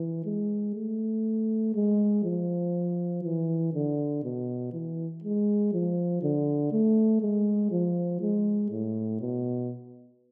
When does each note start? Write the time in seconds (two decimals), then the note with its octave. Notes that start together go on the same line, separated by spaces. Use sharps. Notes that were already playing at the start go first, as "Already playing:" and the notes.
Already playing: E3
0.25 G#3
0.75 A3
1.75 G#3
2.24 F3
3.24 E3
3.74 D3
4.24 B2
4.73 E3
5.24 G#3
5.73 F3
6.23 D3
6.72 A3
7.22 G#3
7.71 F3
8.21 G#3
8.71 A2
9.21 B2